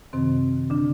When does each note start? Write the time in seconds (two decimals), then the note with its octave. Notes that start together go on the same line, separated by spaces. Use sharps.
0.13 F#2 C3 D#3 C4
0.70 D3 D4